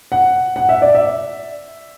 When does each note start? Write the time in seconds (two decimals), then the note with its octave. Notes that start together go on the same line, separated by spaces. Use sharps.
0.12 F#5
0.56 F#5
0.69 E5
0.82 D5
0.95 E5